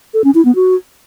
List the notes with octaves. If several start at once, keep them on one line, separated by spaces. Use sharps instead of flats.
A4
C#4
E4
B3
F#4